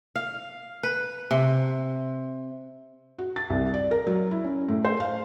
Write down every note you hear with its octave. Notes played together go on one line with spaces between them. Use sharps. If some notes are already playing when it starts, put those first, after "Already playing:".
F5
B4
C3
F#4
A6
C2
D5
A#4
F#3
E4
C#4
A2
C5
F5